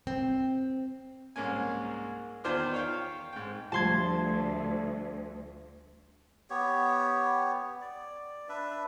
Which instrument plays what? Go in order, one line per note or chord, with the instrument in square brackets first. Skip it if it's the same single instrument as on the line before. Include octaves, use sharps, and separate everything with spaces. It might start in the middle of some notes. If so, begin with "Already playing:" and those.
[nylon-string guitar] C4
[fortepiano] C2 G#2 A#3 C#4 G#5
E2 D#3 F4 C5 D5 F6
C#5 F5 G5
G#2 G5
[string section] D2 [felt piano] F3 G3 [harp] A5 C6 G#6
[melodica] B3 G4 C#5
D5
D4 B4 E5